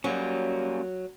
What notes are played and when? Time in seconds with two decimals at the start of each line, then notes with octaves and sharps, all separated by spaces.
0.04 F#3 G3 A#3 C#4